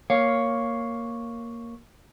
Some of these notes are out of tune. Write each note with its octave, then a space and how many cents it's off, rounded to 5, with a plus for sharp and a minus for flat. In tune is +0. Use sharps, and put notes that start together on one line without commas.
A#3 +0 C#5 +0 F5 +0